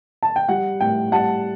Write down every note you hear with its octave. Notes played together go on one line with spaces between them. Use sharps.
A5
G5
G3 F#5
A2 G5
G3 F#5 A5